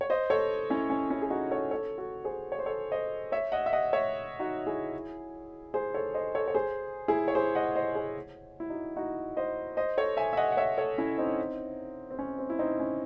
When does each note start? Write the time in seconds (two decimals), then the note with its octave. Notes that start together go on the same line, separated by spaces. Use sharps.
0.01 C#5
0.10 C5 D#5
0.30 A4 C#5
0.70 C#4 E4
0.90 C#4
1.10 C#4 E4
1.22 G#4
1.30 D#4 F#4
1.51 A4 C#5
1.71 A4 C#5
1.98 F#4 A4
2.24 G#4 C5
2.52 C#5
2.59 C5
2.66 A4 C#5
2.92 C5 D#5
3.32 C#5 E5
3.52 D#5 F#5
3.66 E5
3.73 D#5 F#5
3.93 C#5 E5
4.39 D#4 F#4
4.66 E4 G#4
5.74 G#4 C5
5.94 A4 C#5
6.14 C5 D#5
6.35 A4 C#5
6.48 C#5
6.55 G#4 C5
7.08 E4 G#4
7.28 C#5
7.35 G#4 C5
7.55 D#5 F#5
7.75 C5 D#5
7.95 G#4 C5
8.60 E4
8.70 D#4 F#4
8.96 D#4 F#4
9.37 C5 D#5
9.77 C5 D#5
9.97 A4 C#5
10.17 E5 G#5
10.33 E5
10.37 D#5 F#5
10.52 F#5
10.57 C#5 E5
10.77 A4 C#5
10.98 C#4 E4
11.18 C4 D#4
12.11 C4
12.19 C#4
12.39 C4
12.50 E4
12.59 C4 D#4
12.80 C#4